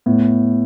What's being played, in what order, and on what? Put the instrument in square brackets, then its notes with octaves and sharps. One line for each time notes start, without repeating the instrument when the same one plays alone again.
[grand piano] A2 [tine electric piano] B3